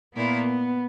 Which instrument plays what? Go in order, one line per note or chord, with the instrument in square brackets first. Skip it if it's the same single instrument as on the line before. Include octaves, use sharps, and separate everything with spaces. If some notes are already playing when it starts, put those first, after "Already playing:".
[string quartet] A#2 A#3 E4 [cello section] B3